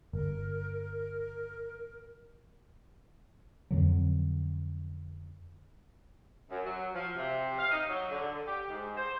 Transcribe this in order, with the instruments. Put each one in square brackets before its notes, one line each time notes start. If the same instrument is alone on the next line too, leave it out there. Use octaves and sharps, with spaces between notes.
[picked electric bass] G1 [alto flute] A#4
[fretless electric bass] F2 D3 F#3
[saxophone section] F#2
F#3
F3
C3
F5
D#4
F#3
D3
G4
G#2
C5